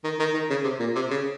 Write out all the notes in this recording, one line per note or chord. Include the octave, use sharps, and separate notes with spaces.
D#3
D#3
D#3
C#3
C3
A#2
C3
C#3